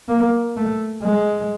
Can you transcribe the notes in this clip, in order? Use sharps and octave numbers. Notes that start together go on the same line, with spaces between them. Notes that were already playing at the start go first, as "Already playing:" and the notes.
A#3
A3
G#3